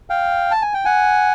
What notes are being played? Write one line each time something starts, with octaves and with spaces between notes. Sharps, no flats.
F5 G5
A5
G#5
G5
F#5 G#5